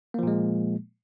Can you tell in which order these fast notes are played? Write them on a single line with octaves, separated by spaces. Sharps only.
A#3 F3 A#2 G#3